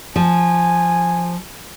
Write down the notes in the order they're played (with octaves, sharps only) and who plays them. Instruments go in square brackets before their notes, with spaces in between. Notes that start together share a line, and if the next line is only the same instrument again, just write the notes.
[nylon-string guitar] F3 [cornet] G#5